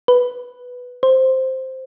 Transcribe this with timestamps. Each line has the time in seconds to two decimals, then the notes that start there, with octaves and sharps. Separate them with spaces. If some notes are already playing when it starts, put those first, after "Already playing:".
0.08 B4
1.03 C5